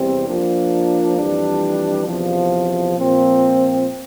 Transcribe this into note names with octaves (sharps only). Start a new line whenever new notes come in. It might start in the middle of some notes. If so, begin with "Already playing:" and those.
Already playing: E2 C3 G3 C4
F3 A#3 D4
F2 E3 G3 D4
E2 C3 F3
A#2 F3 C4